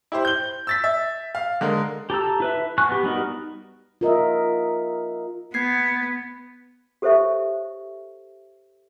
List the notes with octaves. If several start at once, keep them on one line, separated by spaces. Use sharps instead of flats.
E4 G4 C5
G6 G7
E6 A6 B6
E5
F5
D3 G#3 A#4
G4 A4 A#5 E6
E4 B4 E5
F#4 G#5 C#6 F#6
B3 G4
G3 B3 D#4 F#4 A#4
F4 A#4 D#5 E5
B3 G#6 C7
G4 A4 C5 C#5 E5 C#6